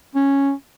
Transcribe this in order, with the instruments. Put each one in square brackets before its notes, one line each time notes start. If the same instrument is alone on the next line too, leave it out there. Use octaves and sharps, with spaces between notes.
[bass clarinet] C#4